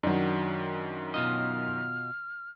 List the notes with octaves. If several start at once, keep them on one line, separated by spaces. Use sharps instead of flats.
F#2 D#3 F#3 D4
B2 F4 D#5 F6